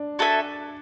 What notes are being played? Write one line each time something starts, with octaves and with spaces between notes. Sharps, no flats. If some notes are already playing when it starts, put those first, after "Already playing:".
Already playing: D4
F#4 A4 E5 G#5